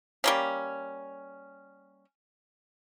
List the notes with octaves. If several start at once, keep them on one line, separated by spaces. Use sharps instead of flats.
G3 A#3 C#4